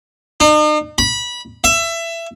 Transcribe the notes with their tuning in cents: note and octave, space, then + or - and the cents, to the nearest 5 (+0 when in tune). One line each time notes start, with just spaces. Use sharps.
D#4 -45
B5 -20
E5 +20